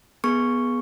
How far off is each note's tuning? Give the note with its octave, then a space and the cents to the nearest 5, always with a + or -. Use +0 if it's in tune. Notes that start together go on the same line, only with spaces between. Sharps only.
B3 -15 G#4 +10 C#6 +0